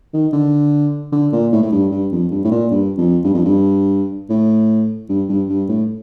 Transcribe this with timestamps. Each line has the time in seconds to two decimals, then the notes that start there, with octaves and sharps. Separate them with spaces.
0.14 D#3
0.33 D3
1.12 D3
1.32 A#2
1.52 A2
1.62 A2
1.72 G2
1.92 G2
2.12 F2
2.31 G2
2.44 A2
2.51 A#2
2.71 G2
2.98 F2
3.25 G2
3.34 F2
3.44 G2
4.30 A2
5.09 G2
5.29 G2
5.49 G2
5.69 A2